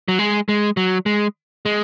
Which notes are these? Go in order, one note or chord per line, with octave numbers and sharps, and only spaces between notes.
F#3
G#3
G#3
F#3
G#3
G#3